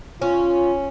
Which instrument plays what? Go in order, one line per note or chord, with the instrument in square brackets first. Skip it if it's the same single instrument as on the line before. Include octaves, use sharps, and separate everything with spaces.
[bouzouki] C#4 [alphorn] F4